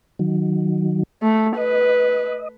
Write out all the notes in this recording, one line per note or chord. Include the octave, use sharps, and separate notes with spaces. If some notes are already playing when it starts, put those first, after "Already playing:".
D#3 F#3
A3
B4 D#5